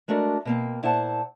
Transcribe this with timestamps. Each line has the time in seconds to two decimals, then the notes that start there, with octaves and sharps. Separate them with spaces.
0.08 G#3 A3 D4 F#4 A#4
0.45 B2 A#3 C4
0.83 A#2 E4 C5 F#5 A5